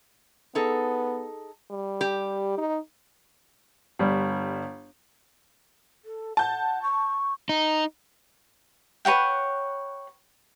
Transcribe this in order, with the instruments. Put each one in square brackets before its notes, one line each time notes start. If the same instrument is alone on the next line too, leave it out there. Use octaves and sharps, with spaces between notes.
[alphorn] B3 [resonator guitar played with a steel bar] D#4 G#4 A4
[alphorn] G3
[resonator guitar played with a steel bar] G4
[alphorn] D#4
[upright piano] G1 G3
[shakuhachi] A4
[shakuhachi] F#5 [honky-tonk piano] A5 G6
[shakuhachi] C#6
[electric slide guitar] D#4
[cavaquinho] B4 C#5 F#5 G5